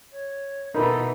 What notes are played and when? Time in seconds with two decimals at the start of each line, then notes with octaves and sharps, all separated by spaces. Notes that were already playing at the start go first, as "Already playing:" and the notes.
0.12 C#5
0.75 B2 E3 D#4 A4 A#4 B5